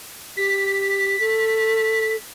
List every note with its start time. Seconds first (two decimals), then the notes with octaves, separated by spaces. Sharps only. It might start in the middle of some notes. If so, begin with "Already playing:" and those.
0.37 G4 B6
1.20 A4